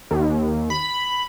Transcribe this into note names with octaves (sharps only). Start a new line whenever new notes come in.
D#2
B5